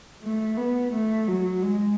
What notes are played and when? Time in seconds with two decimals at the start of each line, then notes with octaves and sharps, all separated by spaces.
0.22 A3
0.57 B3
0.92 A3
1.28 F#3
1.62 G#3